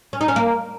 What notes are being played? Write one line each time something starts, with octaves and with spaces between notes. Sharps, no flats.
C#4
D#4
C#4
A#3